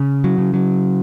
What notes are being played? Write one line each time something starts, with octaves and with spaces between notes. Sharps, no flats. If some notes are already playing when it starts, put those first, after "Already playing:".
Already playing: C#3
F#3
C#3
F#3